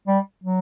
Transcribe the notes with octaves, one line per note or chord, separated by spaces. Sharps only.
G3
F#3